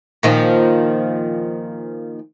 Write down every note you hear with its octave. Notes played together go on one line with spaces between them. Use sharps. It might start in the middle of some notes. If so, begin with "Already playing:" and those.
A#2 D#3 F3